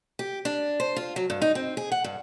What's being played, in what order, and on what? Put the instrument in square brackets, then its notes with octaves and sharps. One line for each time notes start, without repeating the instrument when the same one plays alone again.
[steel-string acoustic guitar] G4
D4
C5
F4
F#3
G2
D#4
C4
G#4
F#5
G2